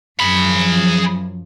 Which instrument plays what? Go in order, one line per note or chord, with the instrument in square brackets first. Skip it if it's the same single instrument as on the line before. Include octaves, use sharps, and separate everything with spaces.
[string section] F#2 F3 [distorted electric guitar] G#4 B5